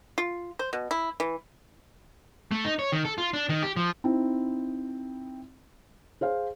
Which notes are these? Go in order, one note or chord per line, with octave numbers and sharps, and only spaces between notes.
F4
C5
B2
E4
E3
A3
D#4
C#5
D#3
A4
F4
D4
D#3
G4
F3
C4 D#4 E4
G#4 C5 F5